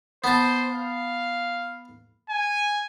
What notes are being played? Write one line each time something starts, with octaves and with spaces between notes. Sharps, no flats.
B3 C5 A5
F5
G#5